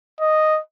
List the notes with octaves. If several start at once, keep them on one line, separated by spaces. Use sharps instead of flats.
D#5